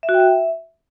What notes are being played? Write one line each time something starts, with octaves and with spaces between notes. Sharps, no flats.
E5
F#4
G5
E5